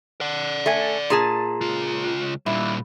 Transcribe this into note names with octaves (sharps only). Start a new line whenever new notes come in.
D5 F#5
A3 G#5
A#2 G#4 A5
C#2 F4
A#2 G3 E4